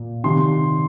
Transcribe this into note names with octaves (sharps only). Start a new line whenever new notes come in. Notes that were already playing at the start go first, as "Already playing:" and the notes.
Already playing: A#2
C3 D#3 C6